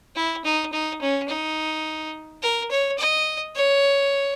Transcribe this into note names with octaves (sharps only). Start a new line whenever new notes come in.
E4
D#4
D#4
C#4
D#4
A#4
C#5
D#5
C#5